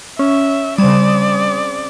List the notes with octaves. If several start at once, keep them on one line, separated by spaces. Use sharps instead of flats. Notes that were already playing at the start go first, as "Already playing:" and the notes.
C#4 E5
C#3 G3 C4 D5 D#6 G#6 E7